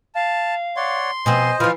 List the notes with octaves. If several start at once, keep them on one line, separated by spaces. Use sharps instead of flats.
F5 A5
C#5 D5 F#5 C6
B2 F3 C4 C5 D#5 G#5
E3 F3 F4 F6